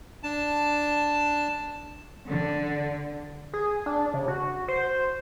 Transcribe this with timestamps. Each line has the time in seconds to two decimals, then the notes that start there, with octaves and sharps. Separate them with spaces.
0.23 D4 A5
2.28 D3
3.54 G#4
3.86 D4
4.14 C#3
4.28 F#4
4.68 C5